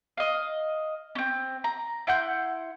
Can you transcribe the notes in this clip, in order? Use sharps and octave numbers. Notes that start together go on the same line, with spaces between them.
D#5 F5
C4 C#4
A#5
E4 F#5 C6 G6